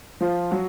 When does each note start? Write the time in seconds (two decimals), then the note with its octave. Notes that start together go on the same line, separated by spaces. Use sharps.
0.21 F3 F4
0.51 F#3 F#4